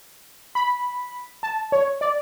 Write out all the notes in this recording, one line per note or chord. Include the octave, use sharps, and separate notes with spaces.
B5
A5
C#5
D5